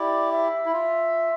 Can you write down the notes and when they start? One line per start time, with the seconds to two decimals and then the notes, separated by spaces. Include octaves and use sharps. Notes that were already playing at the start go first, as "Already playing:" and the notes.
Already playing: E4 G4 D5
0.32 E5
0.65 E4
0.73 F4